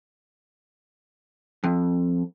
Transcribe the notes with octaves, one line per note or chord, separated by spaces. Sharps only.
F2